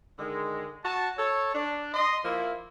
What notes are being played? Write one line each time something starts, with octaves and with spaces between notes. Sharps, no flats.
D3 D#3 G#3
F#4 A5
A4 C#5
D4
D#5 C6
F3 A#3 E4